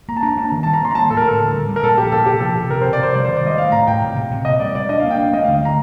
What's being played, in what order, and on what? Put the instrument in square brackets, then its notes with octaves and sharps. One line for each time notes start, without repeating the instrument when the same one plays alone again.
[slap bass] A#3 [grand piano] A#5
[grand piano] A5
[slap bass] D4 [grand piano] A#5
[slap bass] A#3 [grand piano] A5
[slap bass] D#3
[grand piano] A5
[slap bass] G3
[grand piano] A#5
[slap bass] A#3 [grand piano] C6
[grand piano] A#5
[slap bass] A#3 [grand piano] A5
[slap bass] A2 [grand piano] A4
[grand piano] A#4
[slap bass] A2 [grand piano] A4
[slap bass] D3
G3
G3
[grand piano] A#4
[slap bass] A#2 [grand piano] A4
[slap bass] F3 [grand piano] G4
[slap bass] A#2 [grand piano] A4
[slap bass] C3 [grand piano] G4
[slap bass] F3 [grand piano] A4
[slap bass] C3
[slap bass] C3 [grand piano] A#4
[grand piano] C5
[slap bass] C3
[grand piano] D5
[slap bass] C3 [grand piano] C5
[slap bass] G3 [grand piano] D5
[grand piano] C5
[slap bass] D#3
[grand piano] D5
[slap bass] G3 [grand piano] D#5
[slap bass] A3 [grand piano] F5
[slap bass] A2 [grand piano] A#5
[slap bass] A2 [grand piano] G5
[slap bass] C3
C3
C3
[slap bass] A#2 [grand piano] D#5
[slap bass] G3 [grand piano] D5
[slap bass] G3 [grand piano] D5
[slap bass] D4 [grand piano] D#5
[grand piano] F5
[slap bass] A#3
[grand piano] G5
[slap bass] D4 [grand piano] F5
[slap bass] A3 [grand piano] D#5
[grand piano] F5
[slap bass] D3
[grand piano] F5
[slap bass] A3 [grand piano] A#5